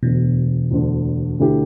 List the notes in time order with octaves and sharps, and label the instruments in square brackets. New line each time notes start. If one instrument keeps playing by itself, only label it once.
[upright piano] E1 D2 D3 [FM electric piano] B2
[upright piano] E1 D2 D3
D2 D3 A3 E4 G4